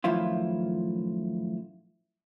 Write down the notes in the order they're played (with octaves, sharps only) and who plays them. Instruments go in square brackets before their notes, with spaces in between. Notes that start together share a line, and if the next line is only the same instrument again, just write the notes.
[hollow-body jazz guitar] F#2 A2 D#3 F3 E4 F4